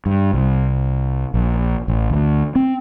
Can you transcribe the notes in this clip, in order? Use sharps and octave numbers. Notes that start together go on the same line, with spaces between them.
G2
C2
A#1
A1
D2
C4